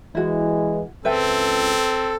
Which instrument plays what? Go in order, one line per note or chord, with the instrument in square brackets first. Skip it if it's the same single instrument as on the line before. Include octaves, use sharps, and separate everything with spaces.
[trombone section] E3 G#3 [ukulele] E4 F#4
[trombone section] C#2 [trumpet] C4 [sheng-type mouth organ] A4 [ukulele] B4 E5 G5